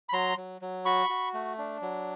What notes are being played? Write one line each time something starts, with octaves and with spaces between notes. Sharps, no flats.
B5
F#3 A#5 C6
F#3
F#3
F#4 B5 C#6
F#4
A3
D4
F#3